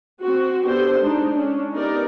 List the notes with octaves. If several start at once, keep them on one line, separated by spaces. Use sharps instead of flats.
C4 F#4
B3 D4 G4 A4 C5
G#3 D4 D#4
C#4 D4
B3 D#4 G4 A#4 D5